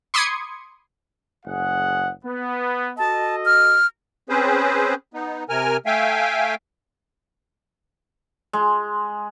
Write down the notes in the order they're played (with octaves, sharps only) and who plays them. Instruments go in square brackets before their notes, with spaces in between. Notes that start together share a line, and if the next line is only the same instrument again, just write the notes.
[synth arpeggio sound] B5 C6 D6 D#6 G#6 C#7
[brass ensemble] F#1 G#4 F#5
B3
[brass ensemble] F#4 A4 D#5 [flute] A5
[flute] F6
[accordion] C4 C#4 G#4 B4 C5
B3 D#4
C3 A#4 G#5 F6
A3 E5 F5 G5 G#5
[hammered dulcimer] G#3